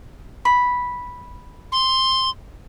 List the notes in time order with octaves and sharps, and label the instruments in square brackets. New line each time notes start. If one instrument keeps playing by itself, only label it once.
[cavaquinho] B5
[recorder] C6